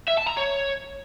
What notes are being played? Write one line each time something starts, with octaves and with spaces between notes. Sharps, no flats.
E5
A5
A#5
C#5